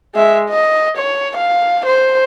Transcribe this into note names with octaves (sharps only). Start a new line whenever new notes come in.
G#3 E5
D#5
C#5
F5
C5